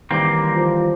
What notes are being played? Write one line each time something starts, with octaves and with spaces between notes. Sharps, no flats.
D#3 E3 G3 A#3 C4 D6 G6
F3